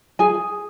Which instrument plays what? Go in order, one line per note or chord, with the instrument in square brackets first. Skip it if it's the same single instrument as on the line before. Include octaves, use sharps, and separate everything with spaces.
[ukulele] G#4 G#5